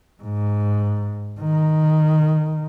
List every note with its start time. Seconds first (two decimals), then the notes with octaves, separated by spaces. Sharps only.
0.23 G#2
1.41 D#3